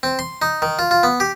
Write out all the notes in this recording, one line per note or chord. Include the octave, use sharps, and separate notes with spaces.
C4
C6
D#4
D#3
F4
F4
B3
G4